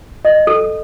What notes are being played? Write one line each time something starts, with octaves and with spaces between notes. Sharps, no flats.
D#5
A4